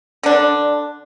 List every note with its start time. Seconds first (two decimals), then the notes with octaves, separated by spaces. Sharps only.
0.23 D3 D4